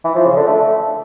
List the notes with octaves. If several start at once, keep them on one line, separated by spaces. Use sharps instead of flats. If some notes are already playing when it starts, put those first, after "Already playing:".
E3
F3
C#3
D3
A3